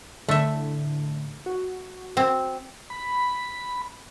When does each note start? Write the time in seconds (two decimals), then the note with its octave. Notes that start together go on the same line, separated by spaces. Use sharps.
0.28 A2 D3 A3 E5
1.46 F#4
2.17 C4
2.90 B5